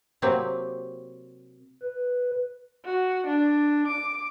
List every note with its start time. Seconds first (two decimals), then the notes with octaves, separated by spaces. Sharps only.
0.22 C3 F#3 A#3 C4 E4 G4
1.83 B4
2.85 F#4
3.27 D4
3.87 D6